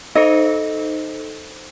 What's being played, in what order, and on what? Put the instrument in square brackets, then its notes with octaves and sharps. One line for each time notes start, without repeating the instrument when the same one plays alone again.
[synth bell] D#4 A4 C5 [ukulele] D#5